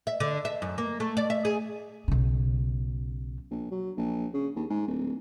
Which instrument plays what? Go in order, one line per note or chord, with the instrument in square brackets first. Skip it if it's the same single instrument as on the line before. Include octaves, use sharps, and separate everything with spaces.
[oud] E5
D3
E5
F#2
A#3
A3
D5
E5
G#4
[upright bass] B1 C#3
[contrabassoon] A#1
F#3
A#1
C#3
D#2
G#2
D1